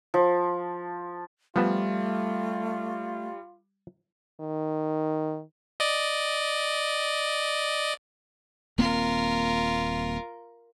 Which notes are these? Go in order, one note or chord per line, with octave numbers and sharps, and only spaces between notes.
F3
F3 G3 A3 B3 F4 A5
D#3
D5 D#5
D#1 A#3 C4 F4 A#4